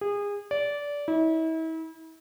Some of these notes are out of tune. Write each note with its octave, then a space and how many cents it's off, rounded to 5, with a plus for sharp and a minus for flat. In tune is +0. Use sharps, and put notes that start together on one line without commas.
G#4 -30
D5 -20
E4 -40